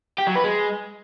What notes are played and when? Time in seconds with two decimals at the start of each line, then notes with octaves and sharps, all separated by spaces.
0.18 G4
0.27 F#3
0.36 B4
0.44 G#3